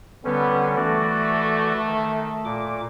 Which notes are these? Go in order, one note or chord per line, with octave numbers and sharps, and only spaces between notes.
D3 G3 B3 C#4
E3 A3 F#4 D5
D#3
A#2 D6